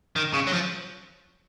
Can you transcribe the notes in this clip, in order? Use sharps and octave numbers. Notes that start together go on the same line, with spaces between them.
D#3
C#3
F#3
F3